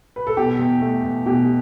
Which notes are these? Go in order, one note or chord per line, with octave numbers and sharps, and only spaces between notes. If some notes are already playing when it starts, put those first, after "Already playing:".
B4
A4
B2 G4
E2
A3
E2
B2 G4